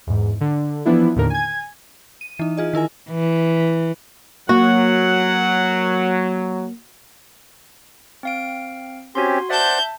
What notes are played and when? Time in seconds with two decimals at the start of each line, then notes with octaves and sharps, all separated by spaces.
0.07 E2 G#2
0.41 D3
0.85 E3 F3 B3 D4 E4
1.16 D#2 A2 D3 A#4
1.30 G#5 G#6
2.21 D#7
2.39 E3 D#4
2.57 F4 G#4 D#5
2.73 D#3 E4 A#4 G#5
3.11 E3
4.49 F#3 A#3 F#4 F#5
8.23 C4 F5 D7
9.15 C4 C#4 F#4 G4 C6
9.50 C5 D5 E5 F#5 A5 G6